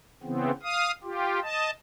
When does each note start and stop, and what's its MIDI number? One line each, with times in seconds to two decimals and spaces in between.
0.23 0.51 49
0.23 0.51 52
0.23 0.51 59
0.23 0.51 60
0.63 0.91 77
0.63 0.91 87
1.03 1.40 65
1.03 1.40 67
1.42 1.70 75
1.42 1.70 81